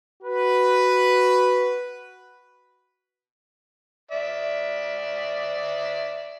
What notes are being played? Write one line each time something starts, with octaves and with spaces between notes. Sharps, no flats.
F#4 B4
D5 E5